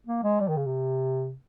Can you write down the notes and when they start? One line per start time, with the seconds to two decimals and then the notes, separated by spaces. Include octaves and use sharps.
0.07 A#3
0.23 G#3
0.40 G3
0.49 D#3
0.57 C#3
0.66 C3